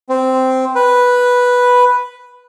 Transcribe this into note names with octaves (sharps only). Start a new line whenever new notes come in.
C4
B4